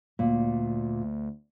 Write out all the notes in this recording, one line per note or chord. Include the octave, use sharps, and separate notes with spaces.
D2 A#2